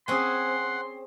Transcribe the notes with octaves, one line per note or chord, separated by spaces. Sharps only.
C4 C#4 G#4 F#5 G#5 C6